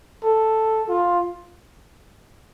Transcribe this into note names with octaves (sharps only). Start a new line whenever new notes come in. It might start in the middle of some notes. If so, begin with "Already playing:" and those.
A4
F4